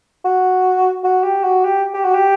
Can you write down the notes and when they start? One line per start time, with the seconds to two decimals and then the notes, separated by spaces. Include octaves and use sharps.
0.25 F#4
1.04 F#4
1.23 G4
1.44 F#4
1.64 G4
1.94 G4
2.04 F#4
2.15 G4